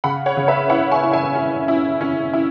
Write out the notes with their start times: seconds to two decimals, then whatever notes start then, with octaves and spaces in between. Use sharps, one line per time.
0.04 C#3 F#5 B5
0.26 C#5 F#5
0.37 C#3
0.48 B4 E5
0.70 E4 C#5 F#5
0.91 G#5 C#6
1.02 E4
1.13 E5 G#5
1.35 C#4
1.68 E4
2.01 C#4
2.33 E4